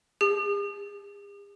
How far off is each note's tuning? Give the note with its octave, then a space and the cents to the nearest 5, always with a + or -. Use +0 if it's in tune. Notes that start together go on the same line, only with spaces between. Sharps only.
G#4 -45